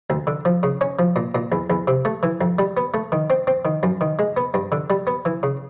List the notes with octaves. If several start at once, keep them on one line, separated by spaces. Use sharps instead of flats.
D2
D3
F3
C#3
C#4
F3
A#2
A#2
E2
E2
C3
A3
E3
F2
G3
B3
A3
D#3
C4
C4
D#3
F#2
D#3
G#3
B3
G2
D3
G3
B3
E3
C#3